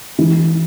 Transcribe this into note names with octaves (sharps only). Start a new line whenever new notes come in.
E3